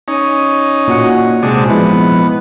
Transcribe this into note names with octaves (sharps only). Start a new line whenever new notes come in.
C#4 D#4
A#2 F#4 F#5
C3 G#3 D4
F3 G#3 B3 E4